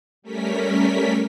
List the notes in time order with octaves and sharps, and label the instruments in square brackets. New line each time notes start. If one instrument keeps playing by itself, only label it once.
[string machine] G3 A3 C#4 A#4 B6